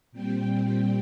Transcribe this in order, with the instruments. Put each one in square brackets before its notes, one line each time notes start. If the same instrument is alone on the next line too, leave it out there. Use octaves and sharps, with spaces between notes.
[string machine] A#2 G3 C4 G5